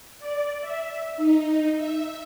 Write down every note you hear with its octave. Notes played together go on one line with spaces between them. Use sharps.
D5
E5
D#4
E5